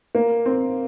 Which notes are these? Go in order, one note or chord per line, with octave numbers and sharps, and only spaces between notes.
A#3
C4